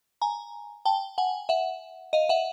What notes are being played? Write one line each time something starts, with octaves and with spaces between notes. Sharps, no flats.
G#5 A#5
G5 A5
F#5 G#5
E5 F#5
D#5 F5
E5 F#5